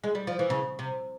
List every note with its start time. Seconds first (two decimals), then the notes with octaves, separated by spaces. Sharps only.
0.04 G#3
0.15 G3
0.27 F3
0.39 E3
0.50 C#3
0.79 C3